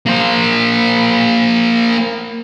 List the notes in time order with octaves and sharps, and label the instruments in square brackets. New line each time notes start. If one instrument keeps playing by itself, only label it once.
[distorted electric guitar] A#3 C5